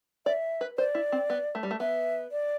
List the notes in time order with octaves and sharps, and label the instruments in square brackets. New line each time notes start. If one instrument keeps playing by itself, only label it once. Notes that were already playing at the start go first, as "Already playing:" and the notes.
[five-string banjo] D5 [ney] E5
[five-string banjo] B4
[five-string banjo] C5 [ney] D5
[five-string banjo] E4
C4
B3
A3
G3
A3
[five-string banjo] B3 [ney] E5
[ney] D5